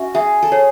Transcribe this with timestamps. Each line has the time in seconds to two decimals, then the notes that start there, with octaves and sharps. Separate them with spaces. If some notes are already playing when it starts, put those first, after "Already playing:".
Already playing: C#4 F#4 E5
0.14 G#4 E5
0.42 A4
0.52 G#4 C#5